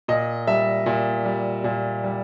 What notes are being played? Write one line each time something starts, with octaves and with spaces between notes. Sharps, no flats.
A#2 D#5
G3 E5
A#2
G3
A#2
G3